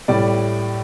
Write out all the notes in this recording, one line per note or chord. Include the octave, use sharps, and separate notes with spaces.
A2 G3 D5